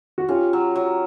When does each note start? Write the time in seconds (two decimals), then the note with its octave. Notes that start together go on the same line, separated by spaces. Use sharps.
0.18 F#4
0.28 C#4 F4 G4
0.53 F#3
0.76 F#3